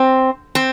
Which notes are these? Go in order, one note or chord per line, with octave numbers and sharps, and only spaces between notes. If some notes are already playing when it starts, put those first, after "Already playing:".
Already playing: C4
C4